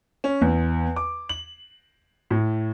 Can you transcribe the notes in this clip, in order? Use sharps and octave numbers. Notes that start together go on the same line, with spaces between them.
C#4
E2
D6
F#7
A2